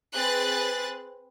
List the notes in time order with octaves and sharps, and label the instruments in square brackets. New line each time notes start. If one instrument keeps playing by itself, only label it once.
[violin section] C4 G#4 B4 F#6 A6